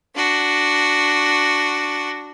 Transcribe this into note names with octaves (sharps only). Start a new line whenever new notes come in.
D4 F#4